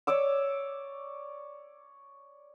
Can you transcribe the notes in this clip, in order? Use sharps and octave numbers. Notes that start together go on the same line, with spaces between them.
C#5 D5 D6 E6